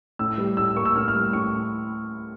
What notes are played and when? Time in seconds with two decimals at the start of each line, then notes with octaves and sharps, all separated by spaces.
0.19 A2 E6
0.38 G3
0.57 A2 E6
0.76 A#3 C#6
0.85 E6
0.95 A2 F6
1.08 F6
1.15 G3
1.33 A2 C#6